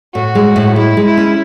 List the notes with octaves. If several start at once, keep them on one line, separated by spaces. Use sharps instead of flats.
A2 F#4
G#3
A2
G#3 E4
G#3
E4
C#4